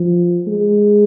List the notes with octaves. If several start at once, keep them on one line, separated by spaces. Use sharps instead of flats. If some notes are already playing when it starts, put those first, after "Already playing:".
Already playing: F3
G#3